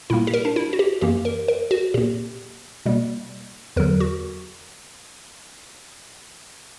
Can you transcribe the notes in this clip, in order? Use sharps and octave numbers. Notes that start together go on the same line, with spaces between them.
A#2 G3 A#3 E4
G4
A#4
D4
E4
F#4
G4
F#2 E3 A#3 G4
A#4
A#4
F#4
A#2 A#3 G4
B2 G3 A#3
E2 D3 F#3 A#4
F#4